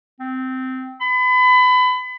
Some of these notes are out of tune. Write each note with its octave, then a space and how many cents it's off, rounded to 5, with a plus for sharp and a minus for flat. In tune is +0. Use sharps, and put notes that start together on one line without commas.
C4 -15
B5 +30